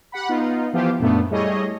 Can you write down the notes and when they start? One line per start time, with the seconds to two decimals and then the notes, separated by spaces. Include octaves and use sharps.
0.12 G4 F#5 B5
0.29 B3 D#4 F4
0.73 E3 F3 B3 F4 G4 C5
1.00 F#2 A#2 A3 B3 D4
1.31 G3 A3 E4 G#4 C#5 D#5